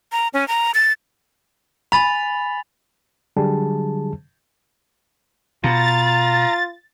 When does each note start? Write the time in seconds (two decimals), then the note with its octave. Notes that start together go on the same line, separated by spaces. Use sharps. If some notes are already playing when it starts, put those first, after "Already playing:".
0.12 A#5
0.34 C#4
0.48 A#5
0.74 A6
1.92 G#5 B5 A6 F7
3.37 D3 F#3 G3 G#4 A5
5.64 B2 F4 A#5 A6